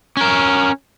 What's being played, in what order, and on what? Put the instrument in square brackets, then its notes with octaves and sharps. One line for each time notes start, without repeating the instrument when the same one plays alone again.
[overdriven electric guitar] C#4 A#4